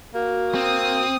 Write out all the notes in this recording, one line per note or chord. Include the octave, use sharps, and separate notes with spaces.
A#3 F#4
C4 D#6